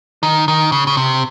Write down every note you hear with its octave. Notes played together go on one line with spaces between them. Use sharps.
D#3
D#3
C#3
C#3
C3